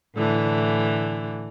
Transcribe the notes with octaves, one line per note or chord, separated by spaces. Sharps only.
A2 D3 E3